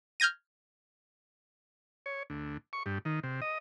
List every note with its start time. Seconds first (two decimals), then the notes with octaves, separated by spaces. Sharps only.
0.20 F6 G6 G#6 A#6 D#7
2.06 C#5
2.30 D2
2.73 C#6
2.86 G2
3.05 D#3
3.23 C3
3.42 D#5